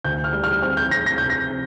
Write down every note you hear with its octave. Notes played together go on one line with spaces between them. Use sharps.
D2 G6
F6
G3
F6
C4 F6
G6
C4 A#6
A#6
C3 G6
A#6
C3